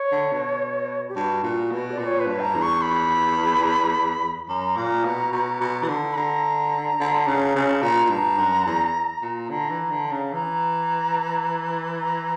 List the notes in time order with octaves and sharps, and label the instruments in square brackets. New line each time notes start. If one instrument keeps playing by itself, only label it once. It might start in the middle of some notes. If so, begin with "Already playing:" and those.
Already playing: [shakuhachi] C#5
[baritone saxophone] D3
B2
[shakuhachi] G4
[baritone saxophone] G2 [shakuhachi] F#4
[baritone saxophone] A#2
B2
[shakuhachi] D5
[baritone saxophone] A#2
[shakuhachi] C#5
B4
[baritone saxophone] G2
[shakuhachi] A#5
[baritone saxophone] E2
[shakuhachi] C#6
B5
[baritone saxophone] F#2 [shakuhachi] A#5
[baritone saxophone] A#2
B2
B2
B2
E3
D3
[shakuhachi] B5
[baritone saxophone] D3 [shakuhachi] A#5
[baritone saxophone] D3
C#3
C#3
[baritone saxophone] A#2 [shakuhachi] A#5
[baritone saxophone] A#2
G2
F#2
E2
A#2
[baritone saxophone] D3 [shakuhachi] A#5
[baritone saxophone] E3
D3
C#3
[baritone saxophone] E3 [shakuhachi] A#5
[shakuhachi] A#5